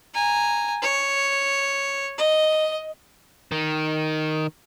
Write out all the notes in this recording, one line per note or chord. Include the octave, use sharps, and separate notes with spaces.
G#5 A#5
C#5
D#5
D#3